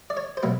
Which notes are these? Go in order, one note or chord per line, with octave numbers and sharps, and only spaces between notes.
D5
C#5
C5
B2 F#3 A#3 B4